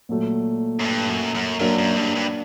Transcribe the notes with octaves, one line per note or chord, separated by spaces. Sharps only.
A#2 F#3 A3
F#2
G2
F#2
F#2
F#2 F#3 A#3 D4
F#2
G2
G2